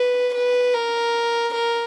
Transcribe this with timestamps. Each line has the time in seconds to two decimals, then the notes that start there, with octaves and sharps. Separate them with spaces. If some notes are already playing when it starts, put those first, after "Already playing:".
Already playing: B4
0.34 B4
0.74 A#4
1.54 A#4